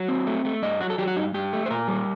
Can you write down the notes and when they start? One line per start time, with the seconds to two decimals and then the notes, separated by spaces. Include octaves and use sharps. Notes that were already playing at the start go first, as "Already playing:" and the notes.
Already playing: F#3 F#5
0.08 C4
0.27 A3
0.45 A3
0.62 G2 D#5
0.81 F#3 F#4
0.90 A4
0.98 F#3 G4
1.07 F#4
1.16 G2 D#4
1.34 G2 G4
1.53 A3
1.66 C5
1.71 A#2 A#4
1.88 G3